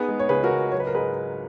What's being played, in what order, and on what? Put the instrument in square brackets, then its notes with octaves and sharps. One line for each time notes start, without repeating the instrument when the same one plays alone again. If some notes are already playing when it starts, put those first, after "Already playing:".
Already playing: [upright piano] B3 D#4 [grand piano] G#4 B4
[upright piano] G#3
[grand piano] C#5
[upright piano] C#2 [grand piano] G#4 B4
[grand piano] F#4 A#4
[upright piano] C#2
[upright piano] F#3 [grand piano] C#5
[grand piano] B4
A#4
[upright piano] G#2 [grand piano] G#4 B4